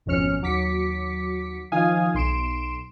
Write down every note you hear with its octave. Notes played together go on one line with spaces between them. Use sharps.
G#1 F2 B2 C#4 F6 C#7
D#2 F#3 D6 B6 C#7
D#3 F3 F5 G#5 D#6
B1 C6 D7 E7